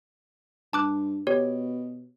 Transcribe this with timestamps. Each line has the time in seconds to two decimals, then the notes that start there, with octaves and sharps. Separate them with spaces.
0.73 G2 A5 D6 F#6
1.27 B2 G4 C#5